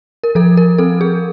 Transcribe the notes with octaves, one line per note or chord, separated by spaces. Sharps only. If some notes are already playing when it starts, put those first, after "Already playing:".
A#4
F3 A4
A#4
C4 A4
G#4